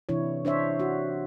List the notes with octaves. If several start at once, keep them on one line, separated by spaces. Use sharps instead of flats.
C3 E3 D4 E4 C#5
D4 C5 C#5 E5
F#4